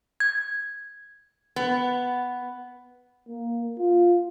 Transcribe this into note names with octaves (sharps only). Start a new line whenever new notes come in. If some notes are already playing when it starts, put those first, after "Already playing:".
G#6
B3
A#3
F4